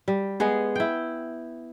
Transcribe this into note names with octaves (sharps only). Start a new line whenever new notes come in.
G3
G#3 B3 G#4
E4 G5